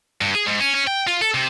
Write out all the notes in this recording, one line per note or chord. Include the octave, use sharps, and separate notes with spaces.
G2
G#4
G#2
C#4
C#4
G5
F4
A4
C3